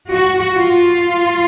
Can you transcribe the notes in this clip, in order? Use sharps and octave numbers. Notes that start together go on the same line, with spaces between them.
F#4
F4